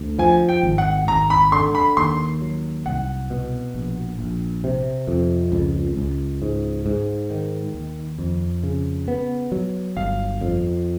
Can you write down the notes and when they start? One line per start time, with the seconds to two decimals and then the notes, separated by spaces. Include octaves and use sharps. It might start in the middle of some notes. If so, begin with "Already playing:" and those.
Already playing: D2
0.19 F3 G#5
0.49 G5
0.63 G#1
0.78 F#5
1.08 G#1 A#5
1.30 B5
1.52 D3 C6
1.75 B5
1.97 D#2 C6
2.42 F#3
2.86 C2 F#5
3.30 B2
3.74 A#1
4.19 A#1
4.64 C3
5.07 F2
5.52 C#2
5.97 C#2
6.42 G#2
6.86 G#2
7.30 D#3
7.74 D#2
8.18 F2
8.63 C#3
9.08 B3
9.52 F#3
9.97 G1 F5
10.41 F2